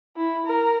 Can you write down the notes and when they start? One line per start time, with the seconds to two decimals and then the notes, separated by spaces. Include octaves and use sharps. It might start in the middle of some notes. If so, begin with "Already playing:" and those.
0.16 E4
0.46 A#4